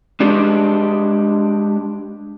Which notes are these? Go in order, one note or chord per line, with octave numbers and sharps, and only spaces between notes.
G#3 D4 G4 D5